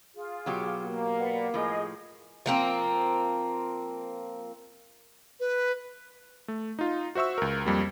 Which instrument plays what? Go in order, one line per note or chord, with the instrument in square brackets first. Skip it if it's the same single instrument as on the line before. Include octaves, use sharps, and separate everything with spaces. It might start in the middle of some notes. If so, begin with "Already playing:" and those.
[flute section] F4 G#4
[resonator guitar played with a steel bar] B2 F#3 G4
[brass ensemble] A#3
[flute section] B4 D5 F#5
[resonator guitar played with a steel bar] A2 F3 [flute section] G#4 D#5
[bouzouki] F3 A#3 C4
[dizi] B4
[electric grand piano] A3
D#4 F4
F#4 C5 E5 C#6 E6
C#2 A#4
F2 G3 A#3